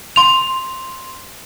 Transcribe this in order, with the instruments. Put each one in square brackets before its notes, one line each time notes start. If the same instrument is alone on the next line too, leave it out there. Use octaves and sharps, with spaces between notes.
[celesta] C6 F7